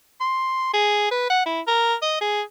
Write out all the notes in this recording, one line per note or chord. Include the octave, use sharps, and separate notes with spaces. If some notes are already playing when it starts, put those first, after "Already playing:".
C6
G#4
B4
F#5
E4
A#4
D#5
G#4